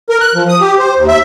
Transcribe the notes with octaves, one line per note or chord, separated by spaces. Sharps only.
A#4
F#6
F3
D#6
G4
C5
D#2
E5